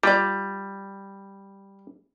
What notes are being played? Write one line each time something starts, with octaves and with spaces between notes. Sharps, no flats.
G3 F4 D5